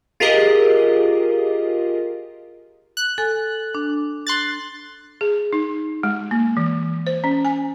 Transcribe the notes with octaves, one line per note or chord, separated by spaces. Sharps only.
F4 G4 G#4 A#4 D#5
F#6
A4 G#5
D4
C6 F#6 A6
G#4
D#4
G#3
A#3
E3
C5
C#4
G#5